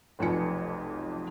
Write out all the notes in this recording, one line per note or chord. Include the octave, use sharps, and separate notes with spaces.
F1 B1 F2 F4 G#5 C#7